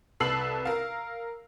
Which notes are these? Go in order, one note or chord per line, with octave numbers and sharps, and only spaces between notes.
C2 A4 B4 E6 C7 F#7
A#4 F5